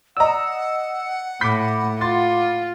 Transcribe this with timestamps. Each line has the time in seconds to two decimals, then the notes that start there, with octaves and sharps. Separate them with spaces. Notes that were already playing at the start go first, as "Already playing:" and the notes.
0.17 D5 D#5 F#5 A#5 E6
1.41 A2 B5 D6 G6 B6
2.01 F4 C6 A6